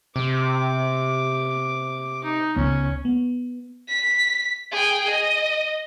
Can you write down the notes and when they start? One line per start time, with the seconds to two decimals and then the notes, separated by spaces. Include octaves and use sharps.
0.16 C3 D6
2.24 D#4
2.56 C#2 B3 C#4
3.05 B3
3.88 B6
4.72 G#4 G5
5.10 D#5